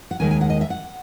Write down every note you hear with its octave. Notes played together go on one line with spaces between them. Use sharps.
F#5
D#2 D#3 G#3 G#5
G#5
F#5
D#5
E5
F#5